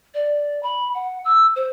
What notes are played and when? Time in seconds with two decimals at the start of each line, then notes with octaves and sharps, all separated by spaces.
0.14 D5
0.63 B5
0.95 F#5
1.25 E6
1.56 C5